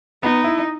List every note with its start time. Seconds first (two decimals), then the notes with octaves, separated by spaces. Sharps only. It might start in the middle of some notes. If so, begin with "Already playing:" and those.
0.23 B3 D#4
0.44 E4